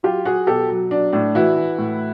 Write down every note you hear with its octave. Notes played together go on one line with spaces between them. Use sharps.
F#3 F4 G4
F#3 F#4 G#4
B2 G4 A4
F#3
F#3 D4
A2 D4
E3 E4 F#4
E3
A2